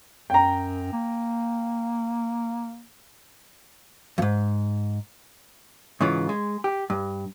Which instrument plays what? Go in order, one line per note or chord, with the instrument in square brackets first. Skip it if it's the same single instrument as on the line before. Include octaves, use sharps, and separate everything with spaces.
[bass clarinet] F#2 [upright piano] G5 A#5
[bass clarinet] A#3
[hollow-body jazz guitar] F2 G#2
G#2 C#3 E3 F4
G#3
G4
G2